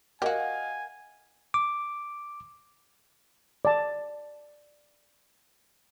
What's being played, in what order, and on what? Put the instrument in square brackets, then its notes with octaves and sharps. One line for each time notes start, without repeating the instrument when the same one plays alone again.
[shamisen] F#4 G4 [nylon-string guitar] A#4 F#5 [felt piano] D#5 F5 [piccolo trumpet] G#5
[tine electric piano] D6
[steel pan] D5 A5